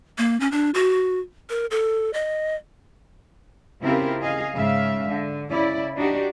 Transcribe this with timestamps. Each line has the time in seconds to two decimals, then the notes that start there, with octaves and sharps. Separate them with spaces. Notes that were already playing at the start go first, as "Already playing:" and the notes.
0.18 A#3
0.40 C#4
0.52 D4
0.74 F#4
1.50 A#4
1.71 A4
2.13 D#5
3.82 C#3 C4 E4 F4 G4 A#4
4.22 G#4 D#5 F5
4.55 G#2 C#3 G#3 E5 F5
5.09 D3
5.50 C#3 E4 D5
5.97 D4 D#4 F#4 G4